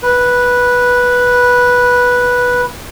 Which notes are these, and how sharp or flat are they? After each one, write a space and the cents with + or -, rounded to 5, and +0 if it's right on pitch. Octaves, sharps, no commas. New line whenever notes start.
B4 -10